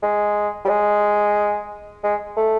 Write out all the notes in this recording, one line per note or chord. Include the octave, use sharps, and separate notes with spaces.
G#3
G3
G#3
G#3
A3